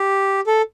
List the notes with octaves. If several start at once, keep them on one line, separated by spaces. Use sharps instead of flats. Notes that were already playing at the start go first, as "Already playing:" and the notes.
Already playing: G4
A4